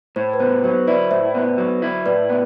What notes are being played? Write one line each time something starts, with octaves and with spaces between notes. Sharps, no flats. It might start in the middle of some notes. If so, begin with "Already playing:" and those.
A2 C5
B4
B3 C5
F#3 C5
E4 B4 D5
A2 C5 E5
B3
F#3
E4
A2 B4 D5
B3